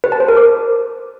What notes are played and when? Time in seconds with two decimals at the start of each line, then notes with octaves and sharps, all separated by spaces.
0.04 B4
0.12 A5
0.20 C5
0.28 A#4
0.37 D6